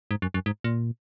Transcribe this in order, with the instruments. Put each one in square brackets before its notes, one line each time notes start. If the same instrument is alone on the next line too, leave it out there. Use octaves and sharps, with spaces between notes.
[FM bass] G#2
F#2
F#2
G#2
A#2